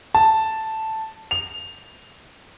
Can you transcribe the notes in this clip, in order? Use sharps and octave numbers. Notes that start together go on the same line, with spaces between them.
A5
F7